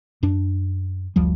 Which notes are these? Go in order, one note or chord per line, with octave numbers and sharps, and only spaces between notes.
F#2 D4
F#1 D2 F3 G3